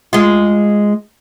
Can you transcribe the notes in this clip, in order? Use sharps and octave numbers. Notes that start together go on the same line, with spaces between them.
G#3 F4